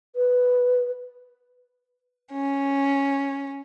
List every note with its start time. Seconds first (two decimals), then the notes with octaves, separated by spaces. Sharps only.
0.16 B4
2.30 C#4